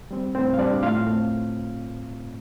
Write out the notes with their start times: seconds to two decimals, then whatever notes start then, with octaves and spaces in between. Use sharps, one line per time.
0.11 G3 C4
0.35 A2 C4 C5
0.54 F5
0.59 G3 C4 D4 D5
0.83 A2 F4 F5
1.07 A3 C4